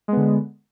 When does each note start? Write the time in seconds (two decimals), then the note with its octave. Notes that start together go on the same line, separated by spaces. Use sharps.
0.08 G#3
0.13 B3
0.17 D3